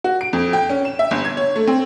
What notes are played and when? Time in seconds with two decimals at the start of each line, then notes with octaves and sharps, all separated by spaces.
0.04 F#4
0.21 D7
0.33 F2
0.53 G5
0.70 C#4
0.85 E7
0.99 E5
1.11 G1
1.25 G#6
1.37 C#5
1.56 A3
1.67 C4